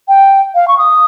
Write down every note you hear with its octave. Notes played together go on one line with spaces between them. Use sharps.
G5
F5
C#6
D#6